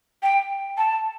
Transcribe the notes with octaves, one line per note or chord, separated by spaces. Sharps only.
G5
A5